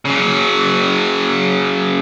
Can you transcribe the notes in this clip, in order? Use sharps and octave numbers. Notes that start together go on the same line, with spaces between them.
C#3 F#3